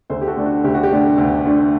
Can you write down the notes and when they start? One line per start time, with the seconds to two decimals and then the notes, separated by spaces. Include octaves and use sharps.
0.10 D2 A4 C5
0.21 G4
0.27 F#4 A4
0.36 D3 A3 D4
0.46 F#4
0.64 D2 G4
0.74 F#4
0.83 G4
0.91 D3 A3 D4
1.18 D2
1.45 D3 A3 D4